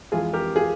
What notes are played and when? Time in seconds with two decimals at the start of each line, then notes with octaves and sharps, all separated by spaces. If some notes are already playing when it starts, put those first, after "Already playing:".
0.12 F2 E3 G#3 F4 G#4
0.33 G4 A#4
0.56 F4 G#4